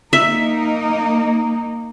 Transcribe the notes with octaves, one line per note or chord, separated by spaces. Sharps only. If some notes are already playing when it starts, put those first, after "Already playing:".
A#3 D#4 E5